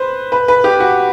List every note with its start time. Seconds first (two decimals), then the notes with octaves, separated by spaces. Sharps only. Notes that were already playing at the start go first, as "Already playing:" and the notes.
Already playing: B4 C5
0.32 B4
0.48 B4
0.64 G4
0.80 F#4